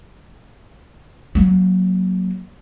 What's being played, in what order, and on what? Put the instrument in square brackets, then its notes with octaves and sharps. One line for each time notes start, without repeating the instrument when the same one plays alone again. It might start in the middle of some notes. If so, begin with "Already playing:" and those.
[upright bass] F#3 A#3